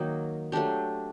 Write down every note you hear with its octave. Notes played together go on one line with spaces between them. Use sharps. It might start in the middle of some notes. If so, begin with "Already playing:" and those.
Already playing: D#3 F#3 A#3 D#4
F#3 A3 D4 G4